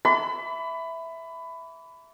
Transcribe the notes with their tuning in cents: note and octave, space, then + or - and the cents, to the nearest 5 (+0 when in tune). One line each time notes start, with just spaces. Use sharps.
E5 +0 B5 +20 D6 -35